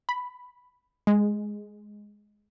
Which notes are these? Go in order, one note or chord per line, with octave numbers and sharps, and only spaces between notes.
B5
G#3